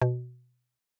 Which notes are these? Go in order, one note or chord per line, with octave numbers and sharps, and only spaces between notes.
B2